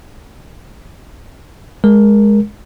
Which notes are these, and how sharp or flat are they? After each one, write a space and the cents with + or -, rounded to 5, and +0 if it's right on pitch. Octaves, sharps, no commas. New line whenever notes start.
G#3 +0 A#4 +15